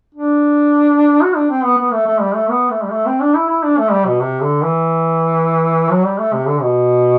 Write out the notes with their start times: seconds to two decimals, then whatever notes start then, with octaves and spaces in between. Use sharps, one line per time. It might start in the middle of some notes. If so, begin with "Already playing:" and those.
0.15 D4
1.22 F#4
1.36 D4
1.50 C4
1.64 B3
1.78 B3
1.93 A3
2.07 A3
2.22 G3
2.35 A3
2.50 B3
2.71 A3
2.84 G3
2.92 A3
3.06 C4
3.20 D4
3.35 E4
3.49 E4
3.63 D4
3.78 A3
3.92 G3
4.06 B2
4.20 C3
4.41 D3
4.63 E3
5.91 F#3
6.05 G3
6.19 A3
6.33 C3
6.47 D3
6.62 B2